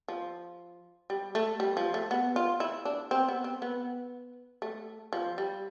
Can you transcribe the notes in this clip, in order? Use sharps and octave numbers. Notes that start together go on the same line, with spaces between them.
F3
G3
A3
G3
F3
A3
B3
F4
E4
D4
C4
B3
C4
B3
A3
F3
G3